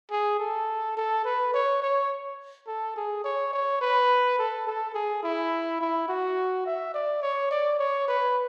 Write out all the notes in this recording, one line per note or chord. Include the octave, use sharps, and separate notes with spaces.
G#4
A4
A4
B4
C#5
C#5
A4
G#4
C#5
C#5
B4
A4
A4
G#4
E4
E4
F#4
E5
D5
C#5
D5
C#5
B4